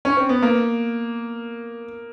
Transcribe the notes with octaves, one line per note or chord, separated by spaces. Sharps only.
C#4
C4
B3
A#3